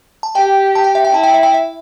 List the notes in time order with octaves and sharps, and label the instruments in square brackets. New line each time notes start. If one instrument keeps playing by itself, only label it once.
[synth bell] A5
[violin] G4 [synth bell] G5
[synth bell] A5
G5
E5
G5
[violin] E4 [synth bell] A5
[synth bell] G5
E5
G5
E5